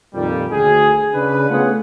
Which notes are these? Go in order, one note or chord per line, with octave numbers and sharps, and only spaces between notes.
F2 A#2 D#3 G3
D2 G#4
C#3 D4 B4
A3 B3 C#4 F4 G#4 F#5